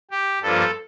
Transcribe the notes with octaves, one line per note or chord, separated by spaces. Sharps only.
G4
G2 F3 A#3 A4